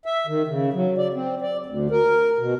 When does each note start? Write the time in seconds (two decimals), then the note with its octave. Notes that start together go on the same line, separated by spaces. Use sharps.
0.06 E5
0.27 D#3
0.47 C#3
0.73 F#3
0.98 D5
1.14 C4
1.41 D5
1.66 D2
1.90 A#4
2.38 B2